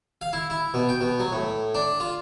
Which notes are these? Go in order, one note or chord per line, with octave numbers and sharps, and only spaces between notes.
F5
E4
E4
B2
G5
B2
F#3
A2
D4
F4